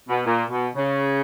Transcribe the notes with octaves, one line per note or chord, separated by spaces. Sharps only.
B2
A#2
B2
C#3